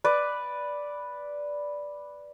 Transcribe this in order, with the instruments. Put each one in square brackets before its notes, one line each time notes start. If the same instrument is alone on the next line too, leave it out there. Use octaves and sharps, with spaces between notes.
[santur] B4 D5